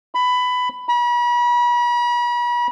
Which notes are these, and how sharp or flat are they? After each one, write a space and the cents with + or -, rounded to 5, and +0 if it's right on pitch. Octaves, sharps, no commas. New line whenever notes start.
B5 +15
B5 -40